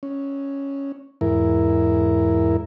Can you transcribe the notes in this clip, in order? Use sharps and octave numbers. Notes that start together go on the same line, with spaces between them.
C#4
E2 G#2 E4 A#4